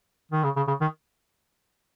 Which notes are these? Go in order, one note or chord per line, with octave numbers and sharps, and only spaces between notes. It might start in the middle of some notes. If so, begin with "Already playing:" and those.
D#3
C#3
C#3
C#3
D#3